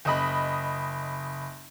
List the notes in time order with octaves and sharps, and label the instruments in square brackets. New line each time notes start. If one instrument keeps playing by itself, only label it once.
[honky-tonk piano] F#1 D#5 B5